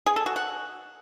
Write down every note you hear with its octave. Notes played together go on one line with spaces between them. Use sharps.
G#4
A4
F#4
F#5